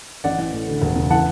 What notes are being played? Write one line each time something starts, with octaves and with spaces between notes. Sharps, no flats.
A1 D5 F#5
E3
A2
D2
E1
C#3
E3 F#5 A5